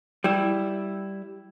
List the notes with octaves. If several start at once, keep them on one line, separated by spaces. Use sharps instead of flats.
G3 E4